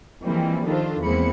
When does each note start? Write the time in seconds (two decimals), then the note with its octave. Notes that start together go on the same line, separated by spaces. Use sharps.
0.24 E3 F3 G3 G#3 A#3 C4
0.65 D#3 D4 F4 A4 C5
1.02 E2 G#3 A#3 C4 B5 C#7